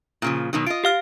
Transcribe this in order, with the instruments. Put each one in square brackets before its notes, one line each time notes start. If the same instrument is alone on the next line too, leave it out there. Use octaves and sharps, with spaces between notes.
[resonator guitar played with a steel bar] A#2 C#3 F3
B2 D#3 F#3
[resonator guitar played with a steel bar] F4 D#5 [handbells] D7
[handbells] G4 F5 F6